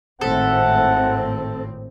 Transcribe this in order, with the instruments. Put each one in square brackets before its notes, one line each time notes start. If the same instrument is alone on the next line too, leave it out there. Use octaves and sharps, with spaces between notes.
[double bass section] G#1 A2 C4 [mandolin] A4 E5 [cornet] F#5